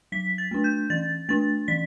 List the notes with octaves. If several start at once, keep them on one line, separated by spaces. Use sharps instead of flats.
F#3 B6
A6
A3 D4
G6
E3 A6
A3 D4 A6
E3 B6